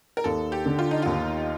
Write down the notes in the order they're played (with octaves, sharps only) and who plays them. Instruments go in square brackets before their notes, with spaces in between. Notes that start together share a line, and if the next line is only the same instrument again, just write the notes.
[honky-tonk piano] A#4
[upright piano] D#2 [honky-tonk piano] A4
[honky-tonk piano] G4
[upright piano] D3
[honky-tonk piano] F4
D#4
[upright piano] D#2 [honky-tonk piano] F4